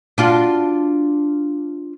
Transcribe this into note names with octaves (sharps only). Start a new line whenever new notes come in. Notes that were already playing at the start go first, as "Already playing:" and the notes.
D4 F4 F#4